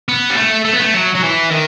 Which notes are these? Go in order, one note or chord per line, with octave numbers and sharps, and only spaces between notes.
B3
G3
A3
A3
B3
A3
F#3
F#3
E3
D#3